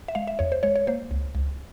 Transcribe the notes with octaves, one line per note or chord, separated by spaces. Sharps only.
E5
G#3 F5
E5
E2 C#5
C5
G#3 C#5
C#5
A#3 C5
C#2
C#2